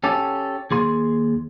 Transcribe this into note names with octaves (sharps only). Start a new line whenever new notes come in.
C#4 G4 A4
D#2 G#4 C6